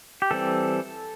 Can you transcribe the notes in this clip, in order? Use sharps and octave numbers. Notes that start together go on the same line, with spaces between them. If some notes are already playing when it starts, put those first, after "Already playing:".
G4
E3 G3 C4 A4